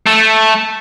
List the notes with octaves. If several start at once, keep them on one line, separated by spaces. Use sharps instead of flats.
A3